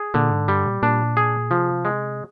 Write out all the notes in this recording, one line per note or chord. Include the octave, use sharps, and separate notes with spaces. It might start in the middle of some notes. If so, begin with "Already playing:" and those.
Already playing: G#4
A#2 D3
G#2
G2 G3
A#2
A#2 D4
G#4
C3 F3
G#3